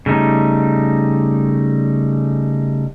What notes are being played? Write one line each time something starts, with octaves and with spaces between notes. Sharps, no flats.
C#3 G3 A3 D#4